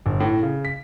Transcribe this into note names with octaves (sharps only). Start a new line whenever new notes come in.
G1
A2
C#3
B6